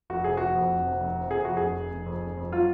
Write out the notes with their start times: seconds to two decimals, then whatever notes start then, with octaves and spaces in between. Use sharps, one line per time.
0.10 F1 F#4
0.24 C3 G#4
0.37 F1 F#4
0.55 F2
0.71 F1
0.86 C3
1.00 F1
1.16 C3
1.31 C3 G#4
1.45 F2 F#4
1.57 F1 G#4
1.77 F1
1.91 F1
2.06 F2
2.21 F1
2.37 F2
2.52 F#3 F4